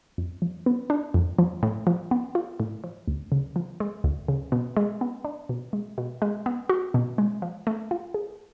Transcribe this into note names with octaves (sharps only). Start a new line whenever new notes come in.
F2
F3
B3
D4
F2
F3
A2
F3
B3
F4
A2
F3
D2
C#3
F3
G#3
D2
C#3
B2
G#3
B3
D4
B2
G#3
B2
G#3
B3
F#4
B2
G#3
F3
A3
F4
G#4